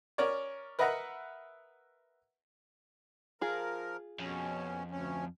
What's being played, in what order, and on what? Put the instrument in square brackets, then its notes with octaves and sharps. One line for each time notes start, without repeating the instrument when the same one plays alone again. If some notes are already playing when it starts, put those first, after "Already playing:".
[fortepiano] C#4 A#4 C#5 D5
A#4 B4 D#5 E5 F#5 A#5
[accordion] F3 A#4 [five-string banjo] F4 G#4
[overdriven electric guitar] F2 [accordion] B2 C#4
[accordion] D2 C#4